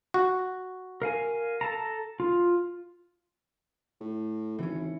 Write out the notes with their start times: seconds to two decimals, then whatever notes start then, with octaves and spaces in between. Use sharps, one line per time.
0.14 F#4
1.02 A#4 F5 G#5
1.61 A4 A5 A#5
2.20 F4
4.00 A2
4.58 G#1 E3 C#4